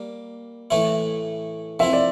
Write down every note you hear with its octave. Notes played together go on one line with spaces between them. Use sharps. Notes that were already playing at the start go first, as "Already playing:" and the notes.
Already playing: G3 A#3
A2 E3 A3 E4
F3 C4 E4 E5
D5